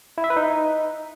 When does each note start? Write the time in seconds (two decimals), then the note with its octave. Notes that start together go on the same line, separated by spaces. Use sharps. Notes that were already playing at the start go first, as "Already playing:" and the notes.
0.18 E4
0.24 E5
0.30 B4
0.36 D#4